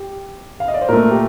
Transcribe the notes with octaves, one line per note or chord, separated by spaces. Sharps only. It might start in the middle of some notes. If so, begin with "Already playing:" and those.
Already playing: G4
F5
D#5
D5
C5
A#2 A3 A#4
G4